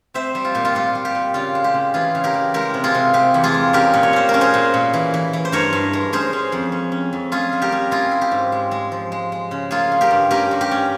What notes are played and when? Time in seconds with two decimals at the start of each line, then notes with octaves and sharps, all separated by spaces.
0.14 C4 C5 E5
0.35 G3
0.45 F4
0.54 A#2 G4
0.65 F4
0.75 A#2 F4
0.95 G3
1.05 G4
1.15 A#2
1.34 C#3 F4
1.55 G#3
1.64 G4
1.74 C#3
1.94 E3 F4 G#4
2.15 C#3
2.24 G4 A#4
2.34 E3
2.54 G#3 G4 A#4
2.74 C3
2.84 F4 G#4
2.94 C3
3.14 C3 G4
3.34 E2
3.44 F4 G#4
3.54 G#3
3.73 C#4 G4 A#4
3.94 A#2
4.03 C#5
4.13 C#4 C5
4.29 A#4
4.34 C#4
4.41 G#4 C5
4.54 A#2
4.74 A#2
4.94 E3
5.14 E3
5.33 E3
5.45 C5
5.52 G2 A#4 C#5
5.73 G2
5.93 G#3
6.13 C#4 G#4 C5
6.33 C#4
6.52 F2
6.72 C#4
6.92 C#4
7.13 F2
7.32 C#4 F4 G#4
7.53 G3
7.62 G4 A#4
7.72 C#4
7.91 E4 F4 G#4
8.11 E4
8.21 G4
8.31 G#2
8.52 G#3
8.71 G#3
8.92 F3
9.12 G#3
9.32 G#3
9.51 C#3
9.71 A#3 F4 G#4
9.92 C#4
10.01 G4 A#4
10.11 G2
10.31 C#4 G4 A#4
10.51 G2
10.61 G4
10.71 C#4